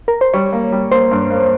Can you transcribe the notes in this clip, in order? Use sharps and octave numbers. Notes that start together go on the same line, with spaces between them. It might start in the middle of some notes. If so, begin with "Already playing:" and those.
A#4
C5
G3 C#5
A#3
G3
A#3 C5
G2
A#3